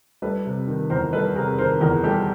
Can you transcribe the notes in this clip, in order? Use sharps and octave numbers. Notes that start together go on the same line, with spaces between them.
G3 A4 B4
C3
D#3
E2 A#4 C5
G3 A4 B4
C3 G#4 A#4
D#3 A#4 C5
E2 G#4 A#4
G3 G4 A4